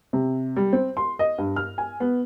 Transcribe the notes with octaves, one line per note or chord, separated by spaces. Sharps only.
C3
G3
C4
C6
D#5
G2
F6
G#5
B3